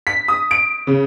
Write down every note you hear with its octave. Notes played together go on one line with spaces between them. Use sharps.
B6
D#6
D7
C#3